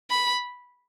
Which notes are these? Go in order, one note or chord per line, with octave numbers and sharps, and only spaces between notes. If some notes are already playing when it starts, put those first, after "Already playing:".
B5